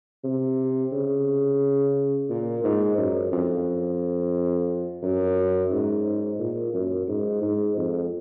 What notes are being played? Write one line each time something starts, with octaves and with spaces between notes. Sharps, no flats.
C3
C#3
A#2
G#2
F#2
F2
F#2
G#2
A#2
F#2
G#2
G#2
F2